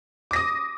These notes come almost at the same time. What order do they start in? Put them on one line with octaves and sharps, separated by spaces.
D6 A#6 D#6